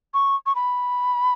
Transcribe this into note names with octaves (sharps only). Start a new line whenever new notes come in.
C#6
C#6
B5